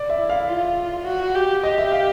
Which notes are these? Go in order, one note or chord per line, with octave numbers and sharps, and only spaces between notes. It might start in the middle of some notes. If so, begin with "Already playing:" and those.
Already playing: D5
E5
E4
F5
F4
F#4
G4
G4 D#5
E5
F5